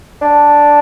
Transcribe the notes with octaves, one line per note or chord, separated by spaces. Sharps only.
D4